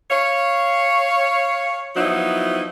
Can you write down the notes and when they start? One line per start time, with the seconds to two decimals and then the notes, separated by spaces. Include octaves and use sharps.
0.10 C#5 F5
1.96 F3 F#3 B3 D#4 E4 F#4